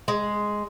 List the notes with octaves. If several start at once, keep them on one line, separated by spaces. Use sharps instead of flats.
G#3